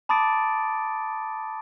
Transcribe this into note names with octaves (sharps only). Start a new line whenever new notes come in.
A5 B5 D6 D#6 A6 D7